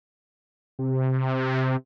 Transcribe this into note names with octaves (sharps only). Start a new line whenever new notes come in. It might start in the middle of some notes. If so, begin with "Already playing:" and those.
C3